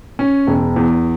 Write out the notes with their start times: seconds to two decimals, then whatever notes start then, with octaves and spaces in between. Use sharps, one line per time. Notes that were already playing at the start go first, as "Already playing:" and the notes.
0.19 C#4
0.47 E1
0.76 E2